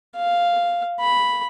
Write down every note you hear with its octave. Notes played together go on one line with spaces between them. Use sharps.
F5
B5